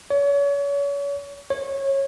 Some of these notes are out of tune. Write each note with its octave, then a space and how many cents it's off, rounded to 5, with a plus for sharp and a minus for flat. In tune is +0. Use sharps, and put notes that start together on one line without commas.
C#5 +35
C#5 -20